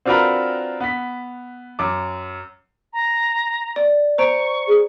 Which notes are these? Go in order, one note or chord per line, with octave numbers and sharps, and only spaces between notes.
C4 D4 F4 F#4 A#4 B4
B3 B6
F#2 D6
A#5
D5
C5 A#5 C#6 D7
G#4